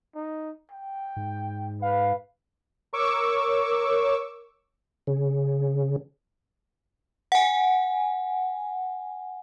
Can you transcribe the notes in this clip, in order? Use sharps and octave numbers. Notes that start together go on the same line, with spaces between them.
D#4
G5
G#2
B4 F5
A#4 C#5 C#6 D6 E6
C#3
F#5 G#5